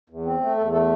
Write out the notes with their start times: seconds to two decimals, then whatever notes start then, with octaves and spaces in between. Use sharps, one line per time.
0.10 E2
0.25 C4
0.41 A3
0.57 E2 A4
0.73 A3 A4